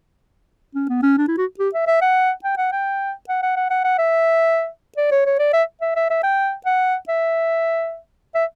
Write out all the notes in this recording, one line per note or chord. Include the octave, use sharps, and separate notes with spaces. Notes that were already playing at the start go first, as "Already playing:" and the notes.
C#4
B3
C#4
D4
E4
F#4
G4
E5
E5
F#5
G5
F#5
G5
F#5
F#5
F#5
F#5
F#5
E5
D5
C#5
C#5
D5
E5
E5
E5
E5
G5
F#5
E5
E5